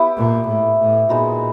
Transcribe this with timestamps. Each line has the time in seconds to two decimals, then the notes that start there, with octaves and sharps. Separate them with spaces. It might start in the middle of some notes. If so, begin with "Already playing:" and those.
Already playing: B3 E4 G4
0.16 A#2
0.47 A2
0.79 A2
1.09 A#2 G#3 B3 D#4 F#4